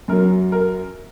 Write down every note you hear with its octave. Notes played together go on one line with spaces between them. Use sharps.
F#2 F#3 A#4
A#4